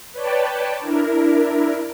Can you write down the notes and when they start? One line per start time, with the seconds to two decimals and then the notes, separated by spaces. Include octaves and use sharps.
0.13 B4 C#5 D5 G5 A5
0.80 D4 E4 A#4